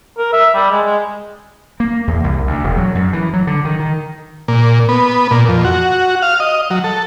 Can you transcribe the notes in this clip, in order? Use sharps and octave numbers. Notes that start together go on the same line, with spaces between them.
A#4
E5
G3
G#3
G#3
A#3
E2
C2
D2
E1
F#3
F#2
E3
F#3
D3
D#3
D#3
A#2
B3
A#2
F2
F#4
F5
D#5
F#3
A4